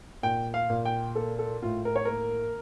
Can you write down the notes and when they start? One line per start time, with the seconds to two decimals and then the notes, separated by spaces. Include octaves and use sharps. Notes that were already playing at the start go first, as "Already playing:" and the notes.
0.23 A#2 G5
0.54 F5
0.70 A#2
0.85 G5
1.15 A#3 A4
1.39 A4
1.62 A2 F4
1.85 A#4
1.96 C#5
2.05 A#3 A#4